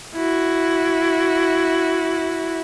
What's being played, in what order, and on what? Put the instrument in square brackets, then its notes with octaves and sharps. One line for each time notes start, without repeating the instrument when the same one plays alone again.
[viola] E4 F#4